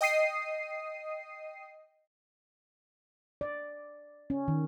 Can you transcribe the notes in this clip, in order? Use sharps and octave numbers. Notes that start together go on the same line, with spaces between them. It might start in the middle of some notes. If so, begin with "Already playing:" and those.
D#5 G5 D#6 C7 D#7
D5
C#4
D#3